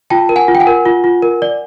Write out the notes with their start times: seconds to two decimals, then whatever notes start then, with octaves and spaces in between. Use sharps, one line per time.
0.10 F4 G5 A5
0.29 A#4
0.36 F#5 G#5
0.48 F4
0.55 G5
0.60 F#5 G#5
0.67 A#4
0.85 F4
1.04 F4
1.22 A#4
1.42 D5